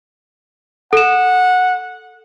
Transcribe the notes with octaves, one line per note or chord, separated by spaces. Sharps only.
A4 F#5 E7